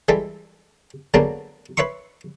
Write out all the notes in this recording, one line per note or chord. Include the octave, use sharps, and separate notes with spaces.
E3 G3 G#3 A4
D3 F#3 G#3 A#3 B3 D4
B4 C#5 E5 C6 C#6